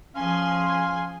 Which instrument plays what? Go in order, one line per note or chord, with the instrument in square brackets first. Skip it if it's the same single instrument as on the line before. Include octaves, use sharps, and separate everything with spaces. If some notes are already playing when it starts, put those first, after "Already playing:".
[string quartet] F3 G#4 [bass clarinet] C#4 [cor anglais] F5 [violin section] G#5 C6